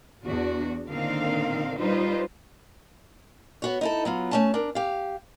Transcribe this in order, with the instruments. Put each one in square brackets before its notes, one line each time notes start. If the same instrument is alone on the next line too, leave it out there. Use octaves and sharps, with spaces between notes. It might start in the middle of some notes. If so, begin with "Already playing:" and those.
[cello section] E2 D4 F#4
A#2 D3 D#3 C4 A#4 F5
G3 D#4 F4 B4 C5
[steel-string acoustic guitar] B3 F#4 C#5
D#4 E4 A4
F#3 B3 F4
A3 C#4 A5
D4 A#4
G4 F5